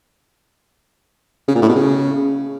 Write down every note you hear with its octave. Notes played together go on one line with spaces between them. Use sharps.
C#3
A#2
A2
B2
C#3